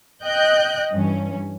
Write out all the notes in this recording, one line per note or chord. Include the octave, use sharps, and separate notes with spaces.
D#5 G5 F#6 G6
G2 E3 C#4